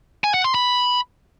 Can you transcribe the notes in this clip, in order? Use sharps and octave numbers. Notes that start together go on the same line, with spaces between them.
G#5
F#5
C6
B5